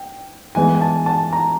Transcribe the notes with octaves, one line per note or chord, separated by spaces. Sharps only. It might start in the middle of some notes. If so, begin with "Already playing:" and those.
Already playing: G5
E3 G#3 B3 G#5
G#5
A5
A5
A#5